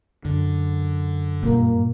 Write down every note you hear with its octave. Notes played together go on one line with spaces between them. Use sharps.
F#2 D3
G2 A#2 A#3